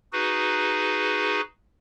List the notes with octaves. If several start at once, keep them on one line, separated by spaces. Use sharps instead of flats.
D#4 F#4 G#4 B4